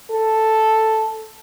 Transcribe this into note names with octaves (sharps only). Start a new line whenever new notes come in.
A4